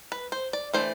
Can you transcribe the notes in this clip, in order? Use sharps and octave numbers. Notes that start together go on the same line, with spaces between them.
B4
C5
D5
E3 A3 D4 C5